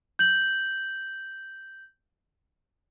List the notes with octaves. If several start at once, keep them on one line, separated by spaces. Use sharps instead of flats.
G6 F#7